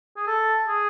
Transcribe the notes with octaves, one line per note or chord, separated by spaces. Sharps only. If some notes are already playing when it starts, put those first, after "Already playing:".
G#4
A4
G#4